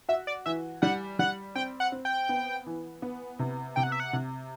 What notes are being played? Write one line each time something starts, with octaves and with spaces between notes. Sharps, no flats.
F#4 E5
D5
E3 E5
G3 F#5
G3 F#5
C4 G5
F#5
C4
G5
B3
E3
B3
C3
C3 G5
F#5
E5
F#5
C3